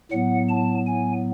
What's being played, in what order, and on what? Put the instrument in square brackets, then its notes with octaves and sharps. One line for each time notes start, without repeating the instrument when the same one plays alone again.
[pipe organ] A2 F#3 B3 F#5
A5
G#5